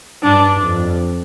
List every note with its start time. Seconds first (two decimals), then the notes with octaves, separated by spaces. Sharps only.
0.23 G2 D4
0.61 F2